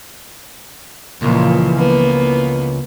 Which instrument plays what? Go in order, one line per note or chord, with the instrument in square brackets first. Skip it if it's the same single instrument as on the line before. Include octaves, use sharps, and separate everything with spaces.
[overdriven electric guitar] C#2 [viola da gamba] A#2 [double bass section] E3 F3
[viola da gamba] A#3 [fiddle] B3